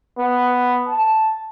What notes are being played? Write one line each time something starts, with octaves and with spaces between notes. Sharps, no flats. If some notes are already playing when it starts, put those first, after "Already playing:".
B3
A5